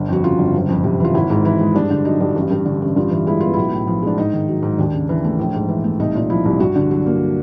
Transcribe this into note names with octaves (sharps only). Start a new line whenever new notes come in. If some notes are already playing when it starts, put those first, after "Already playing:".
Already playing: G1
F2 F#4
C#3 F4
G1
F#1
F2
C3
E3 F4
G#1 E4
G#2
E3 E4
G#3
G2 D4
D3
F#3 D#4
G2
A1
G2
D3
A1
G2 F4
E3
G#3 E4
B3 F4
B1 E4
A2
F3
G#3 D4
G#2 D#4
D#3
F#3
G#2
D#2 D4
C#3
E3
A3
A#1
G#2
E3
A3
C2 D#4
A#2
F3 E4
C2
G2 F#4
D3
F#3
A#3